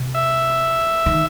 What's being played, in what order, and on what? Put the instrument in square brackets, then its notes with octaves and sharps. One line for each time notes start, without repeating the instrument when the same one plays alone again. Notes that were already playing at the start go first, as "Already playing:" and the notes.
Already playing: [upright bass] C3
[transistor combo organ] E5
[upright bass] D#3